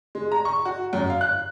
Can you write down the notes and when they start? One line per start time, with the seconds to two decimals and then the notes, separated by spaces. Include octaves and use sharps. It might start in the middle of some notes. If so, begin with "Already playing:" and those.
0.15 G#3
0.32 A#5
0.45 C#6
0.65 F#4
0.93 F#2
1.10 F5
1.21 F#6